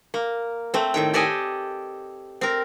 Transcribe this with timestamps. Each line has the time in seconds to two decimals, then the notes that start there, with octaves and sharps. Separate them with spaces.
0.14 A#3
0.74 A3 C4
0.94 A2 D#3 G5
1.14 G4 A4 D5 D#5 G#5
2.41 C4 A#4